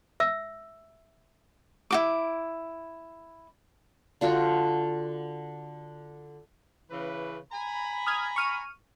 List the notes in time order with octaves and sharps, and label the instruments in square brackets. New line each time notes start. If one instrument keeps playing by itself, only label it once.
[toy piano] E5 E6
[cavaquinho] E4 F#4 D6
[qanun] D3 F4 F#4 G5
[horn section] C#3 E3 B4
G#5 A#5 B5
[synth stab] D#6 F6 G#6
C#6 F6 D#7